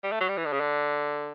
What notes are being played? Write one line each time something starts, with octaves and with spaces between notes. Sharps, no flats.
G3
A3
F#3
G3
E3
D3
C#3
D3